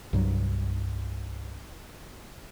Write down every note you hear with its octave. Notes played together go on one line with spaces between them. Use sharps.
C2 G2 F#3